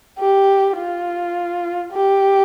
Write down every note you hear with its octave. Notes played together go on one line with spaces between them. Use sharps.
G4
F4
G4